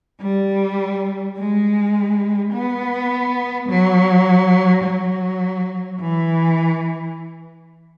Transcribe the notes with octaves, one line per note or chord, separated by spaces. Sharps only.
G3
G#3
B3
F#3
F#3
E3